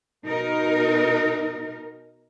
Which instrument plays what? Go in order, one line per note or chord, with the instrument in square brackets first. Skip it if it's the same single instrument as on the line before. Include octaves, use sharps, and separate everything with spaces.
[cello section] B2 D#4 A#4